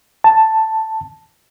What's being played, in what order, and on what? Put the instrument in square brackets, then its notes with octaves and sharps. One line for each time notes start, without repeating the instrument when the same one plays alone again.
[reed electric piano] A5